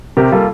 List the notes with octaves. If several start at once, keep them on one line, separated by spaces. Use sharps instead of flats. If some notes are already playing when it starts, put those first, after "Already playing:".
C3 G4 A#4
G3 A#3 F4 A4